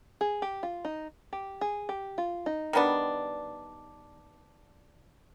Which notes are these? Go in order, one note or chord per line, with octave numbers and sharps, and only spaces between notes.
G#4
G4
F4
D#4
G4
G#4
G4
F4
D#4
D#3 G3 B3 D4